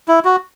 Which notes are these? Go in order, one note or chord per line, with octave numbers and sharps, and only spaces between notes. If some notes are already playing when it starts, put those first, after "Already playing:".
E4
F#4